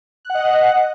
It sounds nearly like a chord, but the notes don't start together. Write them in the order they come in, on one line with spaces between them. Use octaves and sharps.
F#6 F#5 D#5